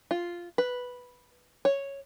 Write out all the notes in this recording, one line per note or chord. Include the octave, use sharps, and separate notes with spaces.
F4
B4
C#5